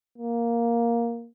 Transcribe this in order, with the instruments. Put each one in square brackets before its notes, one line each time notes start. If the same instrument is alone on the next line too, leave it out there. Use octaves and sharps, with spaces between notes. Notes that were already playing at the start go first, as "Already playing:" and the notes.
[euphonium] A#3